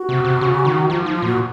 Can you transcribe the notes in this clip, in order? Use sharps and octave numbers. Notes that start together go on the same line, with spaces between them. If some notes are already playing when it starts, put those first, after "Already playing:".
Already playing: F#4
C3
C3
C#3
D#3
F3 F4
F3 D#4
F4
A#2 F#4